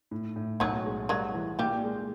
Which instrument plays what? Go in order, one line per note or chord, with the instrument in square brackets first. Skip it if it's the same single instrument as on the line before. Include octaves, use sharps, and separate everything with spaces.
[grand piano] A2
A2
[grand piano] B1 [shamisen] F#3 F#4
[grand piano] G#3
[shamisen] F#3 F#4 [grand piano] G3
[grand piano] E3
[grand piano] A#2 [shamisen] G3 G4
[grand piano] G#3